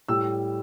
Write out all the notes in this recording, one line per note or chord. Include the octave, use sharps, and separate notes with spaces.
A2 G3 E6